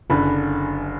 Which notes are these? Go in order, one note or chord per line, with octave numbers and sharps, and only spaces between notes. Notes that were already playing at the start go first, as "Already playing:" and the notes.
F#1 F#2 D3 B5